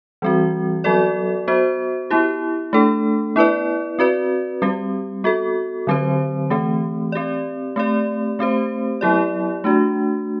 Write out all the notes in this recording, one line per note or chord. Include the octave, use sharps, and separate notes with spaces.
E3 G3 C4 F#4
F#3 B3 F#4 A4 D5
B3 F#4 C5
B3 E4 G4
A3 D4 A4
B3 E4 B4 D5
C4 F#4 B4 D5
G3 C4 G4
B3 F#4 A4
D3 F#3 C4 G4 C5
E3 A3 C4 G4
C4 G4 D5
A3 C4 G4 D5
A3 C4 G4 C5
F#3 B3 E4 G4 D5
A3 D4 F#4